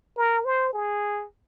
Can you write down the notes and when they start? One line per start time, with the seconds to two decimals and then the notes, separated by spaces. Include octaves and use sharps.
0.17 A#4
0.45 C5
0.74 G#4